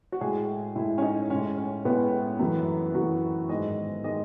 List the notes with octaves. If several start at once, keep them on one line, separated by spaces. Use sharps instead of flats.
F#4
A2 G#3 G#4
A2 G#3 E4
C#4
D#4
A2 G#3 C#4
C#4
A2 G#3 B3
F#2 E3 A3
F#2 E3 A3 F#4
G#2 D#3 G#3 D#5
D#3 G#3 D#5